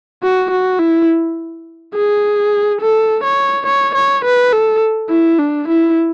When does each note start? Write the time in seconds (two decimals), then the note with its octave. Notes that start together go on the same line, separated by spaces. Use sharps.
0.23 F#4
0.51 F#4
0.79 E4
1.95 G#4
2.81 A4
3.24 C#5
3.66 C#5
3.95 C#5
4.25 B4
4.53 A4
5.10 E4
5.39 D4
5.68 E4